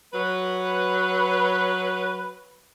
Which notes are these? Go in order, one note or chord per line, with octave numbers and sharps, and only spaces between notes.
F#3 B4